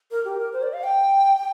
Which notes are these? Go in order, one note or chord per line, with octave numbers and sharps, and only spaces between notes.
A#4
G4
A#4
C5
D5
F5
G5